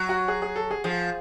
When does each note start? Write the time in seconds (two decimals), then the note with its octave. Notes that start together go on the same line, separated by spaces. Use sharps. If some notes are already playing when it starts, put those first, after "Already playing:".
Already playing: F#3
0.09 F#4
0.28 G#4
0.42 G#4
0.56 A4
0.71 G#4
0.84 F3 G#4